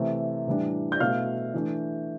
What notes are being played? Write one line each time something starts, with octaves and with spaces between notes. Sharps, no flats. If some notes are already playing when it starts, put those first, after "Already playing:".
Already playing: C3 E3 A3
A2 E3 G3 D4
G6
B2 A3 E4 F5 F6
E3 A3 D4